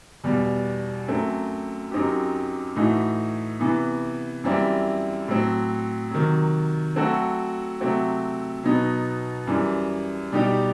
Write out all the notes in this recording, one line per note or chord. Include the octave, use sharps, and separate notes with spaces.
E2 B2 G3
F#2 F#3 A3 C4
F#2 F#3 C4 D#4 G4
A2 E3 A3 D#4 F#4
C3 E3 B3
F#2 E3 G3 C4 E4
A2 F#3 C4
C3 D#3 F#3
F#3 A3 C4 F#4 A4
C3 F#3 A3 C4 F#4
B2 F#3 B3 D#4
F#2 E3 G3
B2 G3 D#4 G4